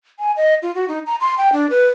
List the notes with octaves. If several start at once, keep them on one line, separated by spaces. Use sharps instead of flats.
G#5
D#5
F4
F#4
D#4
A#5
C6
G5
D4
B4